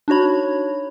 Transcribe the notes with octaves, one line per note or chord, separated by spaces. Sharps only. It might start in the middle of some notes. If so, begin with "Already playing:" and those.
D4 D#4 F#4 C#5 B5